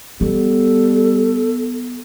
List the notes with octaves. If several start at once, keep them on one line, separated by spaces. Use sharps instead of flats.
G3 B3 A4